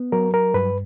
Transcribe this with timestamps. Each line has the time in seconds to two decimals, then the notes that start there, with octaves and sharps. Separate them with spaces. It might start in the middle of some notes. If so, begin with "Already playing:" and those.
Already playing: B3
0.12 F#3 A#4
0.34 A#4
0.54 G2 B4